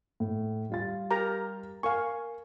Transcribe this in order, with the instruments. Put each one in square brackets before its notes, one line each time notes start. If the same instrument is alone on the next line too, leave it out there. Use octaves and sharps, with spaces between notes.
[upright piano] A2
G3 F4 A6
[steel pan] G4 A#4 A#5
[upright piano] A#4 G#5 [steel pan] F5 C#6